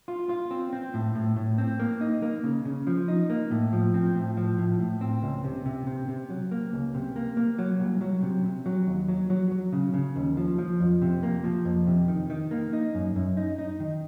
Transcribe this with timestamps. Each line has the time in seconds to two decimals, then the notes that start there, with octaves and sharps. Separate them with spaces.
0.08 F4
0.29 F4
0.51 C4
0.73 C4
0.94 A2
1.15 A2
1.36 A2
1.58 C4
1.80 A#3
2.01 D#4
2.22 A#3
2.44 C#3
2.65 C#3
2.87 F3
3.08 D#4
3.30 A#3
3.51 A2
3.73 F3
3.94 C4
4.15 A2
4.37 F3
4.58 A2
4.80 A2
5.01 C4
5.22 C#2
5.44 C3
5.66 C3
5.87 C3
6.08 C3
6.30 F#3
6.51 A#3
6.73 C#2
6.94 C3
7.16 A#3
7.37 A#3
7.58 F#3
7.80 C2
8.01 F#3
8.23 C3
8.44 C3
8.66 F#3
8.87 D#2
9.08 F#3
9.30 F#3
9.51 F#3
9.73 C#3
9.94 C#3
10.16 D#2
10.37 F3
10.58 F3
10.80 F2
11.02 C3
11.23 A#3
11.44 F3
11.65 F2
11.87 C3
12.08 D#3
12.30 D#3
12.51 A#3
12.73 D#4
12.95 F#2
13.16 F#2
13.37 D#4
13.59 D#4
13.80 D#3